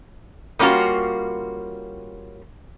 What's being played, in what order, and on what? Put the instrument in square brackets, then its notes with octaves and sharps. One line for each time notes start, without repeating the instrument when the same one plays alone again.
[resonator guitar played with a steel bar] G3 A#3 C#4 F4 F#4